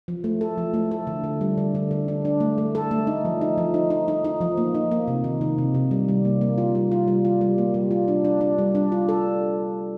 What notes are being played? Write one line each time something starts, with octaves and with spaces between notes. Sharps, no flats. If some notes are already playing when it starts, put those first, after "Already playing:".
F3
A3
A4
F3
A3
A4
D3
D3
G3
D3
D3
D3
D4
D4
A3
A3
A4
A3
D#4
F3
D#4
F3
D#4
D#4
D#4
D#4
F3
A#3
D#4
A#3
C3
D#3
D#3
C3
C3
G3
G3
A#3
A#3
F4
G3
F4
G3
F4
G3
A#3
G3
F4
D4
D4
D4
G3
D4
F4
A4